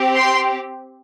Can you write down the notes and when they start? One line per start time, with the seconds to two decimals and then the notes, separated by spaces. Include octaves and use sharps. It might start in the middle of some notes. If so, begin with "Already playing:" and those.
Already playing: C4 G4
0.16 G5 C6